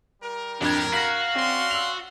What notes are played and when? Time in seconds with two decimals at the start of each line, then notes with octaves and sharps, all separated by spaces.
0.22 G3 A#4
0.61 F2 A2 D4 G4 A#4 G#6
0.93 F#4 F5 A#6 B6
1.35 C4 C#4 D5 C6
1.70 E6 F7